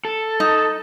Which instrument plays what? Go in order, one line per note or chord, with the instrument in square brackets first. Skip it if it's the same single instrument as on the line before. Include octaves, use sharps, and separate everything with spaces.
[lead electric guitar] A4
[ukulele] D#4